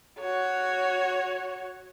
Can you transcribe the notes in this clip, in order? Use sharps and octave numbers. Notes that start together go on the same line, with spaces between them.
F#4 C#5